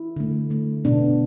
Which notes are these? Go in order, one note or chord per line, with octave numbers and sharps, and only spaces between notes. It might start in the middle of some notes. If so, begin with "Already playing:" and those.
Already playing: E4
D3 A3
D3 A3
B2 B3 D4